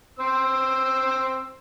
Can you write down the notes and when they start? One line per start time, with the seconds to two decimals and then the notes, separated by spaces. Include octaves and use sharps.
0.19 C4 C5 E6